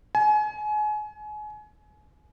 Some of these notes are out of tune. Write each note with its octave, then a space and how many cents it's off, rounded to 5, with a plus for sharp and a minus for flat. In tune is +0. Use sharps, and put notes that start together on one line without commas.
G#5 +30